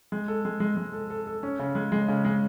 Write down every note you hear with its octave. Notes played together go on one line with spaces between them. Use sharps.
G#3
A4
G#3
G#3
G#3
A4
A4
A4
C#4
C#3
G#3
G#3
C#3
G#3